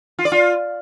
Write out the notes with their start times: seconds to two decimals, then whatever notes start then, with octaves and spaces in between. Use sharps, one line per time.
0.19 F4
0.25 D5
0.32 F4